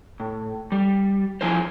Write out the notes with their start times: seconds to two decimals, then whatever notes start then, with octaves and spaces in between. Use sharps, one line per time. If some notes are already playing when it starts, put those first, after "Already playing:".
0.20 A2
0.72 G3
1.41 F3 E4 G#4 A#4 C5